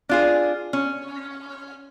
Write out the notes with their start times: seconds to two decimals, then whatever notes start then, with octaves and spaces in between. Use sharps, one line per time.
0.09 D4 F4 G#4
0.73 C#4